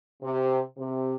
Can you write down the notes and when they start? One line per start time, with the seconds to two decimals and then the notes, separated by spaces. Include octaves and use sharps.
0.22 C3
0.77 C3